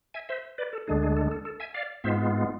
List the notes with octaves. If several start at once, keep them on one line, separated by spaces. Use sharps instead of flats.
E5 G#5
C5 E5
B4 D5
A4
D2 D3 G#3 D4 G#4
G#4
A4
A4
A4
E5 G#5
D5 F5
G#2 G#3 B3 F4 C5 E5